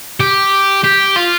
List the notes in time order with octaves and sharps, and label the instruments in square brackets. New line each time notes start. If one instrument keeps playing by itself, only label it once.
[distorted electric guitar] G4
G4
F4